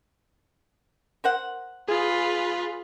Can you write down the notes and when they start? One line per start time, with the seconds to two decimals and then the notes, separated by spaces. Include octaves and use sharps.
1.24 A#4 C5 F#5
1.88 F4 G#4 B4